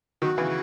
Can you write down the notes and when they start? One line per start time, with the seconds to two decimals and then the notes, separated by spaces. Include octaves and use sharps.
0.22 D#3 F#3 F#4
0.38 C#3 E3